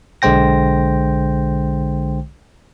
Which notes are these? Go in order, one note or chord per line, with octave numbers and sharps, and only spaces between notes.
B1 D3 G#3 C5 G5 A#6